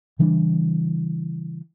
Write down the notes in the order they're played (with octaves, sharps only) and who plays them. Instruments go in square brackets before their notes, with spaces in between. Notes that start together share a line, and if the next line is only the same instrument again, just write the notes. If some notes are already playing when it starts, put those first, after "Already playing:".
[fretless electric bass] C#3 E3 G3 D4